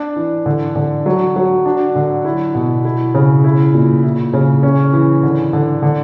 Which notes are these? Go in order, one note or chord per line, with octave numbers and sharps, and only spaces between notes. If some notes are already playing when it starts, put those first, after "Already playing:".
Already playing: D4
E3
D3
D3
F#3
F#3
D4
D3
E4
B2
E4
C#3
E4
A#2
E4
C#3
C#4
E3
D3
D3
D3